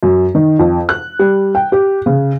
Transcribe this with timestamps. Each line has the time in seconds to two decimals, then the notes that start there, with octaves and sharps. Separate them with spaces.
0.03 F#2
0.35 D#3
0.59 F2
0.89 F#6
1.19 G3
1.55 G5
1.72 G4
2.06 C#3